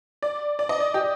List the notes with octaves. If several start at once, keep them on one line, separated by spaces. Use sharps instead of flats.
D5
D5
D#5
D5
G4